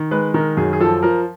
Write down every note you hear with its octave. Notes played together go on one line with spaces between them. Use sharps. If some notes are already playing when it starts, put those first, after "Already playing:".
Already playing: D#3
G#3 B4
D#3 A#4
F#2 G#4
G#4
F3 A4
F3 A#4